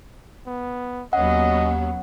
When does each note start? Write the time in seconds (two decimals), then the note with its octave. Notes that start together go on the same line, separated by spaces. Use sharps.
0.47 B3
1.13 D#2 F#3 B3 C#4 D#5 F#5